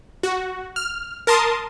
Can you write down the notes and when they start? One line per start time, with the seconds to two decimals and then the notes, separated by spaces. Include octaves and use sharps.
0.23 F#4
0.76 F6
1.27 A#4 A5 C6 D#6